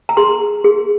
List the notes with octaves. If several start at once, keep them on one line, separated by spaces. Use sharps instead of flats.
A#5
G#4 C6
G#4